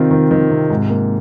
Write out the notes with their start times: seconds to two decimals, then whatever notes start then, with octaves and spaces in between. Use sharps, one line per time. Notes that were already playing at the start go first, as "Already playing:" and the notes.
Already playing: C3 D#3 C4 F4
0.11 D#3
0.31 D#3
0.50 C3
0.70 G#2
0.90 A#3